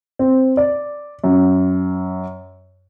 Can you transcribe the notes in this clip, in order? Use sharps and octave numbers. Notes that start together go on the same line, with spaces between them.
C4
D5
F#2